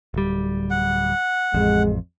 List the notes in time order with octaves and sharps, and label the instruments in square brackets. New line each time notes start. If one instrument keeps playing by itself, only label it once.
[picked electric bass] D1 G3
[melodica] F#5
[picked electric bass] A1 F2 [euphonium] G#3